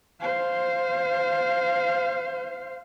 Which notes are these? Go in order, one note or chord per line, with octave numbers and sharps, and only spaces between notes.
C5 F5